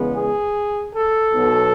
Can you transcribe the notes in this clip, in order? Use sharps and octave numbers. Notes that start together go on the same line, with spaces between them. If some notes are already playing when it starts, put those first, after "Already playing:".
Already playing: E2 C#3 G#3 B3
G#4
A4
B1 B2 F#3